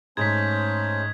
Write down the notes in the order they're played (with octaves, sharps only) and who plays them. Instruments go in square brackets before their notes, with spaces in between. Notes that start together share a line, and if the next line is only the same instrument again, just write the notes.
[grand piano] G#2 [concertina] A3 C#4 C5 [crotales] G#6 B6